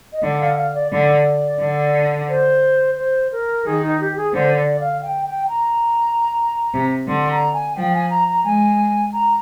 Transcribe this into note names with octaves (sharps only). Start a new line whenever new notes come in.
D#5
D3 D5
F5
F5
D5
D3 D5
D3
C5
C5
A#4
D#3 G#4
D#4
G4
G#4
D3 C5
D5
F5
G5
G5
A#5
C3
D3 C6
A#5
G#5
F3 G5
G#5
A#5
A#5
G#3 G#5
A#5